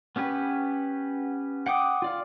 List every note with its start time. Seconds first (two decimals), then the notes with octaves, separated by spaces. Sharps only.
0.16 B3 C#4 G4 B4
1.66 F#5 G5 D6 D#6
2.02 F4 D5 F5